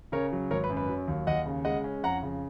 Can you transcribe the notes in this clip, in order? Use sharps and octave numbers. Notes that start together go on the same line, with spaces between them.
C#3 A#4 C#5
F#3
G#1 A#4 C#5
B4
F#2
B4
F#3
D#2
D#2 D#5 F#5
C#3
G#3 D#5 F#5
C#4
F2 F#5 A#5
C#3